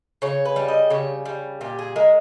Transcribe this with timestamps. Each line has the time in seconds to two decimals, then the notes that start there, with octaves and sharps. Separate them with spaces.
0.22 C#3 C#5
0.45 B4
0.56 G3
0.68 D#5
0.90 C#3 C#5
1.25 G3
1.61 A#2 G4
1.79 G#4
1.96 G#3 A#4